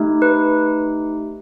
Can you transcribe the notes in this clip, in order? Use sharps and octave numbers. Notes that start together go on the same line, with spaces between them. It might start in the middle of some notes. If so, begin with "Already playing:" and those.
Already playing: A3 D#4 G4
B4